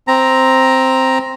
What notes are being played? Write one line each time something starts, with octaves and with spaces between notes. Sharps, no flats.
C4 A#5